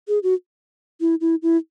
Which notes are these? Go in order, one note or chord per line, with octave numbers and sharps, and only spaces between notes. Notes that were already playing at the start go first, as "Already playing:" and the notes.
G#4
F#4
E4
E4
E4